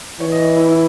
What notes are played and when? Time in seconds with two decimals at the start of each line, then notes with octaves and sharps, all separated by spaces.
0.20 E3 C#5
0.32 D#5
0.44 C#5
0.57 E4
0.69 E4